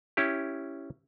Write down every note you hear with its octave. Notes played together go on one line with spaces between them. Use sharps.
C#4 E4 G4